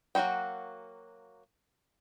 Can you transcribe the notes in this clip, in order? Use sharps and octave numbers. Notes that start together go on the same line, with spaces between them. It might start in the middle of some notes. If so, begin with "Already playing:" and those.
F#3 A#3 D#4 F#4 G5